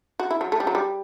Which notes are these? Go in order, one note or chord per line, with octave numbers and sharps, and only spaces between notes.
F#4
E4
F#3
A3
G3
F#3
G3